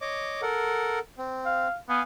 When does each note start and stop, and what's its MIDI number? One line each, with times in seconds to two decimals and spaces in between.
0.01 0.41 73
0.01 0.41 75
0.01 0.41 86
0.42 0.99 69
0.42 0.99 70
0.42 0.99 78
1.18 1.68 60
1.46 1.76 77
1.89 2.01 59
1.89 2.03 77
1.89 2.03 80